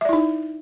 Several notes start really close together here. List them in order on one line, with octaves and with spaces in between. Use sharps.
E5 D5 E4 D#4